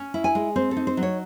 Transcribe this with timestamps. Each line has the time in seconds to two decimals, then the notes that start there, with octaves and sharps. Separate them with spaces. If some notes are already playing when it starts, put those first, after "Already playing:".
Already playing: C#4
0.14 E4
0.24 G#5
0.35 G#3
0.56 C4 C5
0.71 A4
0.77 D#4
0.87 C5
0.97 F#3
1.03 C#5